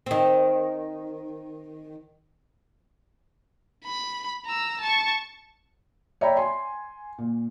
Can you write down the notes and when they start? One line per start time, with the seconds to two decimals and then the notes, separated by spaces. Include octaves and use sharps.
0.06 D#3 C4
3.85 B5
4.46 A#5 E6
4.80 A5 C#6
6.21 C#5 D5 E5 G5 A#5 B5
6.37 G#5 C6
7.18 A#2